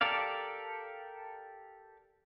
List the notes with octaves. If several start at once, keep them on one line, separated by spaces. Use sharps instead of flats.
G4 A4 A#4 D5 F5